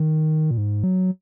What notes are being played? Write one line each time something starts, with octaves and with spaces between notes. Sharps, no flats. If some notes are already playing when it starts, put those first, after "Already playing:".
Already playing: D#3
A#2
G#2
F#3